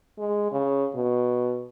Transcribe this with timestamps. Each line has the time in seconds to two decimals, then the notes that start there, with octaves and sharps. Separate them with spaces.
0.19 G#3
0.52 C#3
0.95 B2